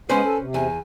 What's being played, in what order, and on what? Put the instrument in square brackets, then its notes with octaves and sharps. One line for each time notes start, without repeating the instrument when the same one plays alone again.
[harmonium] G#3 B3 G#4 [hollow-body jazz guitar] C#4 B4 C5 [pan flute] G#5
[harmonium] A4
C3
[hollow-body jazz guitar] E2 [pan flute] G#5